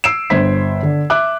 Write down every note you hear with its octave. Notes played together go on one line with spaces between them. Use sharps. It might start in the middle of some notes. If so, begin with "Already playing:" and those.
E6 C7 D7 E7
G1 C5 G#6 B6
D3
E5 D6 F#6